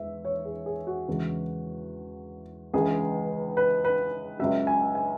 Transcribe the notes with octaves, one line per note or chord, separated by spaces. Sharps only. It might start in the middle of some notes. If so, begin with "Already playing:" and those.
Already playing: E2 E3 G#3 E5
C#5
G#4
G#4
F#4
E2 C#3 E3 G#3
C#2 C#3 E3 G#3 G#4
B4
B4
C#2 C#3 F#3 E5
G#5
G#5